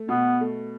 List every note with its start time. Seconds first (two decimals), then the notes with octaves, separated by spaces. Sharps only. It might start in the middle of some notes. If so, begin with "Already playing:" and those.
Already playing: A3
0.08 B2 B3
0.41 A3